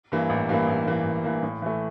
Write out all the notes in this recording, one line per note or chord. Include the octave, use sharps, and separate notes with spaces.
G2 E3 A#3
A1
G2 E3 A#3
A1
G2 E3 A#3
A1
G2 E3 A#3
A2
E3 A3